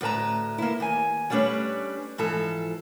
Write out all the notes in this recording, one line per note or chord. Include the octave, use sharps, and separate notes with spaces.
D2 A2 B4 A5 A#5
A#3 E4
D#2 G#5
G3 A3 C#4 D4 B4 C#5
G#2 E3 F3 A4